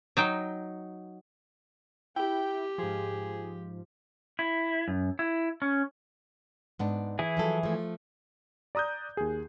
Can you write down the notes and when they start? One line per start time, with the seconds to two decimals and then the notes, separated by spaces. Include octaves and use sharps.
0.17 F#3 D#4 G5
2.16 E4 G4 G5
2.78 G#2 F3 G#4
4.39 E4
4.88 F#2
5.19 E4
5.62 C#4
6.79 G#2 B3 D4
7.19 E3 E4 G#4
7.37 F3 F#3 A4
7.63 F3 A3
8.75 D5 A#5 D#6 F#6 G6
9.17 D#2 G#4